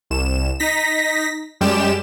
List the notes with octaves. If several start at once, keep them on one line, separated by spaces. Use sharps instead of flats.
C2 E7
D#4 A#6 B6
F#2 G3 G#3 G4 E7